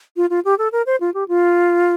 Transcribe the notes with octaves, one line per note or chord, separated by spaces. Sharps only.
F4
F4
G4
A4
A#4
C5
F4
G4
F4